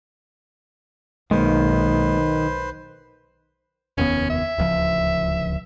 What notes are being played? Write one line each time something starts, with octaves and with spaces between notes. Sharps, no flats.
B1 D#3 G#3 A#3 B4 C5
F1 D#2 B3 C#4
E5
D1 C#2 F3